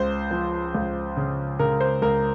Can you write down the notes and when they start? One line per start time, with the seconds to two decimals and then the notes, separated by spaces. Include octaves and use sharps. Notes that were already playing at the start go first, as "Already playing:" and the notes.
Already playing: C#2 C5
0.31 F3
0.75 C#2
1.17 C#3
1.59 C#3 A#4
1.81 C5
2.02 C#2 A#4